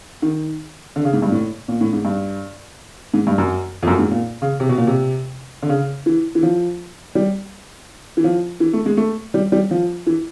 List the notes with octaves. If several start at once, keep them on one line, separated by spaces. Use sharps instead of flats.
D#3
D3
C#3
G#2
G2
A2
A#2
A2
G#2
G2
G#2
G2
F#2
F2
F#2
G#2
A#2
C#3
C3
B2
A#2
C3
D3
C#3
E3
E3
F3
G3
E3
F3
E3
A3
G#3
A3
G3
G3
F3
E3